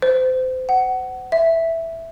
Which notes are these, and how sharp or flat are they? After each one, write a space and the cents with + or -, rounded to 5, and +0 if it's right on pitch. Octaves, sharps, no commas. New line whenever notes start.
C5 -30
F#5 +20
E5 +0